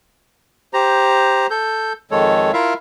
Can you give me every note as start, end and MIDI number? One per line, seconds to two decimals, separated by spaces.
0.73 1.47 67
0.73 1.47 72
0.73 1.47 82
1.51 1.93 69
1.51 1.93 91
2.11 2.52 41
2.11 2.52 51
2.11 2.52 56
2.11 2.52 69
2.11 2.52 73
2.53 2.74 64
2.53 2.74 65
2.53 2.74 70
2.53 2.74 76
2.53 2.74 77